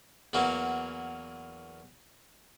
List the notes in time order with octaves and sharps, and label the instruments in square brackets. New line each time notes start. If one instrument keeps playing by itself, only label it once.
[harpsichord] E2 E3 F#3 A#3 C#4